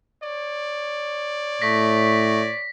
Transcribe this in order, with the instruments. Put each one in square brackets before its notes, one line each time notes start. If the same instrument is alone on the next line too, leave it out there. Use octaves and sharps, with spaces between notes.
[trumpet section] C#5 D5
[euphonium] A2 [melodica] A3 [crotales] A#6 B6